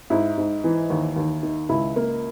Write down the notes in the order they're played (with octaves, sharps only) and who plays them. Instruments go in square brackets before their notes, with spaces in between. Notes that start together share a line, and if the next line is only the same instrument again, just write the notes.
[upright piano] G#2 E4
G#2
E3
D#2
D#2
D#3
C#2 E4
A#3